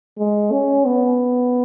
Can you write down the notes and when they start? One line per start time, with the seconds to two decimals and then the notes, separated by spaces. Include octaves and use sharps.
0.18 G#3
0.51 C#4
0.85 B3